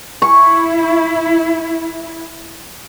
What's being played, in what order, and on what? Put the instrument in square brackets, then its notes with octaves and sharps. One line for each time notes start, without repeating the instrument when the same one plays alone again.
[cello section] E4 [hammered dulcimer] C#6